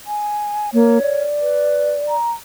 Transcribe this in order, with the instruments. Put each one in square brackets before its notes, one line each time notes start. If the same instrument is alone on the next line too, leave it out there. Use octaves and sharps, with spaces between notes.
[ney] G#5
[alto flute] A#3 [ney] C#5
[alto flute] D5
[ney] B4
A#5